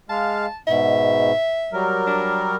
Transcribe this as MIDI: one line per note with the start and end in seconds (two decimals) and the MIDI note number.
0.09 0.46 56
0.09 0.46 77
0.09 0.56 81
0.67 1.32 44
0.67 1.32 47
0.67 1.87 76
1.73 2.56 54
1.73 2.56 55
1.73 2.56 70
2.07 2.43 62